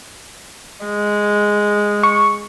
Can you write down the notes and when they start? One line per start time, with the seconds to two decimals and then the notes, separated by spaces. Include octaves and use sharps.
0.85 G#3
2.03 C#6